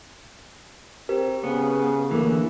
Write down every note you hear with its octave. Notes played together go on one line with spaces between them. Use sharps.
C4 G4 A#4
C#3 B3
D3 E3 A3 A#3